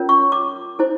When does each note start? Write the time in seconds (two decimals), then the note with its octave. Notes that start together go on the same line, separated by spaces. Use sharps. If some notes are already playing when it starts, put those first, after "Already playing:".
Already playing: C#4 F4 A#4 C#5
0.09 C#6
0.32 D6
0.79 E4 A4 C5